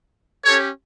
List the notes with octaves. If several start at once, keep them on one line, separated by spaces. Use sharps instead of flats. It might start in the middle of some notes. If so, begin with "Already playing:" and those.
C#4 G4 A4 C#5